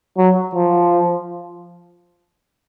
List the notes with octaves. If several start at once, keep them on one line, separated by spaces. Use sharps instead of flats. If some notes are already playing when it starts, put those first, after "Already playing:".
F#3
F3